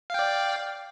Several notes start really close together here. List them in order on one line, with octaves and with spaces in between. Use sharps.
F5 G5 D5